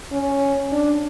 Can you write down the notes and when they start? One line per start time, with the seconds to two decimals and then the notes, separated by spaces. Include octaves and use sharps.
0.13 C#4
0.72 D4